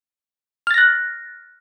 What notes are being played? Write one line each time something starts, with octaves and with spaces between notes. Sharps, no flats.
F6 F#6 A6 A#6